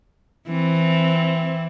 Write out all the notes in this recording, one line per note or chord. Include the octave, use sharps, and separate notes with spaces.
E3 C4